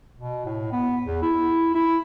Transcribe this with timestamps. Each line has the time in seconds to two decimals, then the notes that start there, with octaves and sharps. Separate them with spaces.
0.18 B2
0.46 A2
0.73 B3
1.06 E2
1.22 E4
1.75 E4